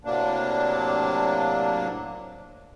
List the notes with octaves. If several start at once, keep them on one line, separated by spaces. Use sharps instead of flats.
A2 C3 F#3 A#3 D4